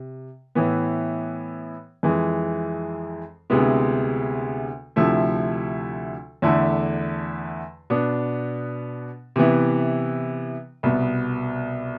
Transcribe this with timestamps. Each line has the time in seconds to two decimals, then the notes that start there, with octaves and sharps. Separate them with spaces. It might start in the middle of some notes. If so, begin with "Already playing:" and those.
Already playing: C3
0.55 A2 E3 B3
2.03 F2 E3 G#3
3.50 D2 C3 G#3 B3 E4
4.96 D2 C3 F3 A3 E4
6.42 E2 D3 A3 E4
7.90 B2 B3 D4
9.36 C3 E3 B3 E4
10.83 C2 B2 B3